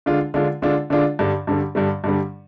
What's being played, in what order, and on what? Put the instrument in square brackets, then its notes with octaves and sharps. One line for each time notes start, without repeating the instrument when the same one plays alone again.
[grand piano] D3 G#3 D4 F4
D3 G#3 D4 F4
D3 G#3 D4 F4
D3 G#3 D4 F4
G2 D3 G3
G2 D3 G3
G2 D3 G3
G2 D3 G3